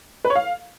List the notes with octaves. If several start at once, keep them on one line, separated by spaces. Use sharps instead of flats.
B4
C#5
F5